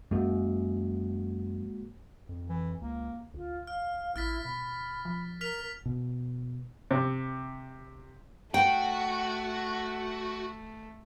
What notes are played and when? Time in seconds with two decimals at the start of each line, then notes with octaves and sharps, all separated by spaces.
0.11 F#2 G#3 A#3 F#4
2.29 F2
2.49 E3
2.82 C#2 A#3
3.34 D2 F4
3.67 F5 F6
4.16 A1 E4 F6 A6 B6
4.45 B2 B5
5.05 F3
5.41 A#4 F6 B6 F7
5.86 B2
6.91 C3
8.54 A3 F#4 G5